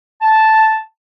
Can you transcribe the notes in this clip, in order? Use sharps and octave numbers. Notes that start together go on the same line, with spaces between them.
A5